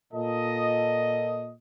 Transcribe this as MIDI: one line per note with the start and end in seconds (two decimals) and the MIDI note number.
0.13 1.51 46
0.13 1.51 69
0.13 1.51 75